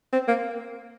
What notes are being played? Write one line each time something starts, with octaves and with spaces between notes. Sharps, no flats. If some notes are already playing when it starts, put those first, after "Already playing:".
C4
A#3